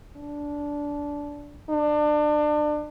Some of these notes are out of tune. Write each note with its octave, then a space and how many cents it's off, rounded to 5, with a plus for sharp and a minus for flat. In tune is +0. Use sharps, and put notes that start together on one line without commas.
D4 -15
D4 +30